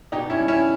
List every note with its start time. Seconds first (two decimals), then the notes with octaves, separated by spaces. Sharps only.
0.12 B2 D#4 G4
0.30 C#4 E4
0.39 G3
0.48 C#4 E4